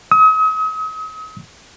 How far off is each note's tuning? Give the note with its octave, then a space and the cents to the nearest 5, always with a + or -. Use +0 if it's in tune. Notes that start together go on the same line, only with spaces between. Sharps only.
D#6 +40